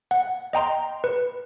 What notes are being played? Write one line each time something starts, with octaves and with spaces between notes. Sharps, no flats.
F#5
D#5 G5 A#5 C6
B4